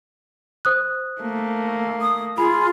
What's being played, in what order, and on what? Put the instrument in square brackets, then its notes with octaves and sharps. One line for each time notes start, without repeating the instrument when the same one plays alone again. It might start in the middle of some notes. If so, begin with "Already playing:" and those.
[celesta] C5 D#6 F#6
[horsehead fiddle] A3 A#3
[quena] D#6
[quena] F4 [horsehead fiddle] G#4 [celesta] B5